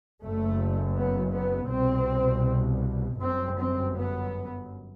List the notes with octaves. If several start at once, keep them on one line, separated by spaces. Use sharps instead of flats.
F#1 F#2 A3
B3
B3
C2 B2 C4
G1 F#2 C4
C4
B3